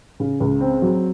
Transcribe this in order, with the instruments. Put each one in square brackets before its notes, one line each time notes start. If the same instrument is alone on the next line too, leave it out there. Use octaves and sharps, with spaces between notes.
[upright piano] C#3
C#2
C4
F#3